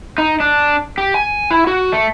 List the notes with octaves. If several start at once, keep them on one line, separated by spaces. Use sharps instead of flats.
D#4
D4
G4
G#5
E4
F#4
A3